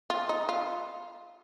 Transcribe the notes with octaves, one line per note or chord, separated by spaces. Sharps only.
F4
D#4
F4